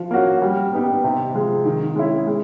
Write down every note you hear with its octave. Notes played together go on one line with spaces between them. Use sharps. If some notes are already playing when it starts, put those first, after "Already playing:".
Already playing: F3
A#3 C#4 F#4
G3
B3 D#4 G4
C3
F3 G#3
D#3
G#3 C#4 E4 G#4
G#3